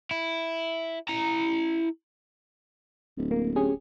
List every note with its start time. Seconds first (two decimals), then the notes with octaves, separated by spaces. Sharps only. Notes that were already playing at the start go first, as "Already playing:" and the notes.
0.11 E4
1.08 E4 A#5
3.18 D1
3.31 A#3
3.56 C#4 G4 G#4